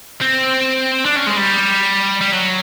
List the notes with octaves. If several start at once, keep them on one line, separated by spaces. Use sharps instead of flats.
C4
D4
C#4
G#3
G3
G3
F#3